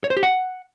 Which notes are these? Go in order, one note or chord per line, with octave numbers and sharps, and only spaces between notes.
C#5
C5
G4
F#5